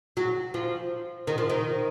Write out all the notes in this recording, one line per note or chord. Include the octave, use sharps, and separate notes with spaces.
F#3
F3
D#3
F3
D#3